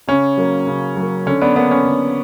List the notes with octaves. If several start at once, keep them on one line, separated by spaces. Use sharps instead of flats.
C#3 C#4
F#3 A#3
C#3
F#3 A#3
D3 C#4
B3 D4
A#3 B3 D4
C#4
D3